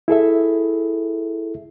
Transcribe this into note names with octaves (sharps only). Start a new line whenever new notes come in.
E4 G#4 A4 E5